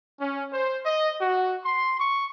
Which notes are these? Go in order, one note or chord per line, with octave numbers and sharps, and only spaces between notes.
C#4
C5
D#5
F#4
C6
C#6